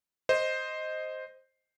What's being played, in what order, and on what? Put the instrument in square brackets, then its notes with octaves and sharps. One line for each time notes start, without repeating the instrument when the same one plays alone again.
[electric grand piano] C5 D#5